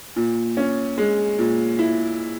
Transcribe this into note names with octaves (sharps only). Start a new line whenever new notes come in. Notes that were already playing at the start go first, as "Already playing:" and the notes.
A#2
C#4
G#3
A#2
E4